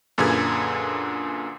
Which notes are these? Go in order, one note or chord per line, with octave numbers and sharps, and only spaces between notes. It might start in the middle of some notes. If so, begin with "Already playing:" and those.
F#2 A#2 D3 G#4 B4 G#6